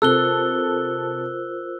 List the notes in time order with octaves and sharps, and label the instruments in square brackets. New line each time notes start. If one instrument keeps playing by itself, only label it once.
[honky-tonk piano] C3 A4 [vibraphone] F4 A#4 C5 [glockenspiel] E6 F#6 G7